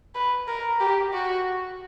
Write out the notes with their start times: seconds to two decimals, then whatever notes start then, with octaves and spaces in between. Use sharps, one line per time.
0.15 B4
0.48 A#4
0.80 G4
1.13 F#4